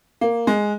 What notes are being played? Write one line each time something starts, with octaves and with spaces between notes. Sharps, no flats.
A#3
G#3